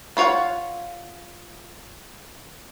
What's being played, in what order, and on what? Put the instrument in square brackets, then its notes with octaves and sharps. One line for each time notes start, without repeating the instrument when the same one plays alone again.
[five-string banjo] B3 F4 C#5 F5 F#5